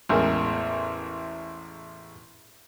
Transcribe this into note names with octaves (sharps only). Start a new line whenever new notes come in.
A1 E2 G#3 A#4